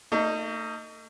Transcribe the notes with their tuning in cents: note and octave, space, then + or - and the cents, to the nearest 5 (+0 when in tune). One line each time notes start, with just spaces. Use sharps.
A3 +45 D#4 +0